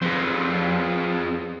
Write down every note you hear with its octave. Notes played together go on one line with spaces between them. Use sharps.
F2 G#4 B4 C5